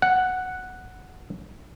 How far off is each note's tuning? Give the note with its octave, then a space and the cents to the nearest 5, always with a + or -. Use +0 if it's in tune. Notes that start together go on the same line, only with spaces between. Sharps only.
F#5 +0